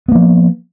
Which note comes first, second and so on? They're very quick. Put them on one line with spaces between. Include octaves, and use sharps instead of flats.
B3 A#3 F3